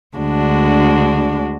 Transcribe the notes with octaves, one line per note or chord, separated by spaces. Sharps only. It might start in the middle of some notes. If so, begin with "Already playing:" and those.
D2 D3 G#3 D4 F#4